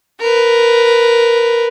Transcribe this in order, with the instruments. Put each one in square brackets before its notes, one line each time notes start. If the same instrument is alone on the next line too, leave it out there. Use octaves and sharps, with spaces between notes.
[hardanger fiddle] A#4 B4